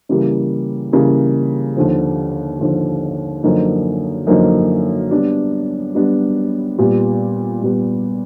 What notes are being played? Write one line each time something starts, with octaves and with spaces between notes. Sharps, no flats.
C#3 E3 G3 A#3
C#3 E3 G3 A#3
D#2 D3 F3
D#2 D3 F3
F#2 D3 F3 A#3 D#4
F#2 D3 F3 A#3 D#4
G3 B3 D4
G3 B3 D4
A#2 G3 B3
A#2 G3 B3